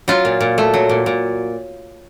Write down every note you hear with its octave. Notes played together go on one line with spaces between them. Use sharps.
F#3 F4
A#2
A#2
A3
F#3
A#2
A#2